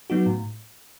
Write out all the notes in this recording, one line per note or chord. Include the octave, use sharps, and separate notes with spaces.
F#3 B3 D#4 F#4
A2